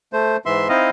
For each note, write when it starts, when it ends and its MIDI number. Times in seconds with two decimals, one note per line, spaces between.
0.13 0.37 57
0.13 0.37 72
0.46 0.68 44
0.46 0.68 52
0.46 0.68 76
0.46 0.68 84
0.69 0.90 60
0.69 0.90 63
0.69 0.90 64
0.69 0.90 75
0.69 0.90 77